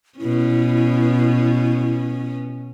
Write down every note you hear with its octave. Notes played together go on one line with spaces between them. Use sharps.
B2 C#4 E4